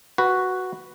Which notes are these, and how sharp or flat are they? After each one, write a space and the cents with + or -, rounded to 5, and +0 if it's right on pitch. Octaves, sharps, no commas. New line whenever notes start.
F#4 +0 B4 +0